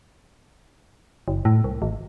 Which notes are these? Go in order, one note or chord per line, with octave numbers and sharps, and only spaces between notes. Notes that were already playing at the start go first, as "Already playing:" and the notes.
F#1
A2
C2
G#1